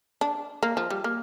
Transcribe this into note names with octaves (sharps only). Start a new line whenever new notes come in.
D4
A#3
F3
G3
A#3